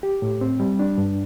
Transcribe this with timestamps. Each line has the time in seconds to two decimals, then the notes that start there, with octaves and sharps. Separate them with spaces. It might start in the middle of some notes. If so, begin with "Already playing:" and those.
0.03 G4
0.22 A2
0.41 C4
0.60 G3
0.79 D4
0.98 G2